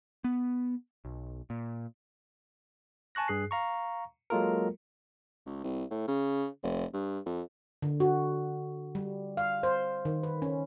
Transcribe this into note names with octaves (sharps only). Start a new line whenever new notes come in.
B3
B1
A#2
G#5 A5 C#6 F#6 A#6
G2 G#4 F#6 C7
F5 A#5 C#6
F#3 G#3 A#3 F4 A4 A#4
C#2
C2
A2
C#3
F1
G2
F2
D3
F#4
G3
F5
C5
D#3
B4
C#4